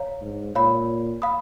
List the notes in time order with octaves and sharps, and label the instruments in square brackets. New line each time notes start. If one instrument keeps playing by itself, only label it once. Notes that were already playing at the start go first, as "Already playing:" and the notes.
Already playing: [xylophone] C#5 F5 A#5
[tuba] G#2
[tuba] A#2 [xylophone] C#5 F5 B5
[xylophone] F5 B5 D#6